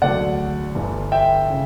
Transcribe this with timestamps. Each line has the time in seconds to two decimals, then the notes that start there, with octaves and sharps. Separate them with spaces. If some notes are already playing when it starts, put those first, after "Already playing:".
0.02 E1 D2 D3 F#3 A3 D5 F#5
0.75 G1 G2 E3
1.12 E5 G5
1.50 C#3